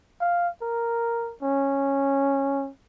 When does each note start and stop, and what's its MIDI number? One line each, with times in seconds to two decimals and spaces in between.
0.21 0.48 77
0.62 1.34 70
1.42 2.70 61